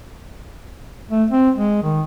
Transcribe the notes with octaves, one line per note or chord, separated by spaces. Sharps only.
A3
C4
G#3
D#3